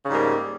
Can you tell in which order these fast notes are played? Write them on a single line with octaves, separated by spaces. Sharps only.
C#3 G#2 G3 A#3